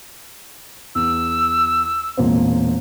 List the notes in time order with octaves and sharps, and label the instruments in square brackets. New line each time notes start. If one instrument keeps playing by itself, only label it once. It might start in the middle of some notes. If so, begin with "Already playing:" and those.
[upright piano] E2 [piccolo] E6
[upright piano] E1 A#2 C4